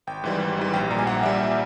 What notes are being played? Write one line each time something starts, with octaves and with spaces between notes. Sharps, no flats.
G#1 G5
G#2 E3 G3
G#1
G#2 E3 G3
A#1 G5
A#2 G3 A#5
G#5
A#1 F#5
A#2 G3 E5